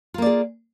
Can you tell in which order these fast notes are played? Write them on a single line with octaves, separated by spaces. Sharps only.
F4 A#3 D5 G#4